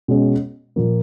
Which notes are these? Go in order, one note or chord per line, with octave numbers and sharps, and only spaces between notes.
B2 G#3 C#4
A#2 F3 A#3